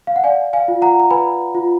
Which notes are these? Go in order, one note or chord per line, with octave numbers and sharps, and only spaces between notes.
F5
F#5
D5 F5 G#5
F5 G#5
F4
F#5 A#5
A#5
B4 G#5 B5
F4